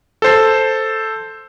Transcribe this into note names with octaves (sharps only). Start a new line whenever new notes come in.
A4 C5